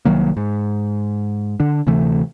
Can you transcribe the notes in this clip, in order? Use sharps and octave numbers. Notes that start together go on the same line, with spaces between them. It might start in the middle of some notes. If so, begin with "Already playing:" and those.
C2 D#3 F#3 A#3
G#2
D3 D4
D2 C3 E3 A3